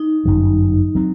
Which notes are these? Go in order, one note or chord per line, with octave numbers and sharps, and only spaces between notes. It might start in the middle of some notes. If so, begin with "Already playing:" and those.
Already playing: D#4
G1 F#2 F#3
F#3 C4